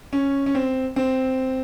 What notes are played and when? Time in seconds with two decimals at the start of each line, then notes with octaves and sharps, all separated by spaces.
0.13 C#4
0.46 C#4
0.55 C4
0.96 C4